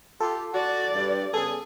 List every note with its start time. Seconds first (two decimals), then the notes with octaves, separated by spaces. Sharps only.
0.20 F4 G4 A4
0.54 F#4 D5
0.94 G2
1.34 C#3 B3 G#4 A4